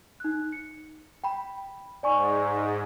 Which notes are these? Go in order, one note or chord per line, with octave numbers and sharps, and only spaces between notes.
D#4 F#6
C#7
G5 B5
G#2 D5 G#5 C#6